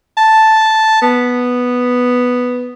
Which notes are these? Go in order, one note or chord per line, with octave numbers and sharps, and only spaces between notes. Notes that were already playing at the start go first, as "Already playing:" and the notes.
A5
B3